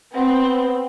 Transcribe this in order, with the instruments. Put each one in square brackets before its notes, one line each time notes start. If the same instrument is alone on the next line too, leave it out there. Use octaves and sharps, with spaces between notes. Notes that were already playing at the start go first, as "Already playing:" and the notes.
[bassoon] B3 [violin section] C4